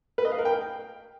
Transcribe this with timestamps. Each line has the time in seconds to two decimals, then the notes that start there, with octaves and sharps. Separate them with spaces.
0.18 B4
0.25 D#5
0.32 F5
0.38 A#4
0.45 G5